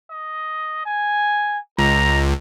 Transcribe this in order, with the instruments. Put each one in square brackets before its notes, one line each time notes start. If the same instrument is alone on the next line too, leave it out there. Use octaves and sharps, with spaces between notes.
[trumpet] D#5
G#5
[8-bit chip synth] C#2 [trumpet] A#5